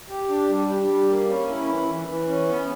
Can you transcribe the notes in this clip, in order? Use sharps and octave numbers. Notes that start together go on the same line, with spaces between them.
G4
D4
G3
G4
G3
A#3
C#4
E4
E3
E3
E3
C#4
B3